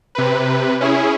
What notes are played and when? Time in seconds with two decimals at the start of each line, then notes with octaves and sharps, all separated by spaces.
0.15 C3 B4
0.81 C#4 E4 G#4